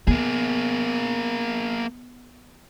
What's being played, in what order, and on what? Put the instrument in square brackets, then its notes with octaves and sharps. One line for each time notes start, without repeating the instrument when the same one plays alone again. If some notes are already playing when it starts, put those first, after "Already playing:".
[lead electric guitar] A#3 G#4 [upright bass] B3